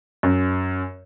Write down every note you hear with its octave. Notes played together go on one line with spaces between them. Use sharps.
F#2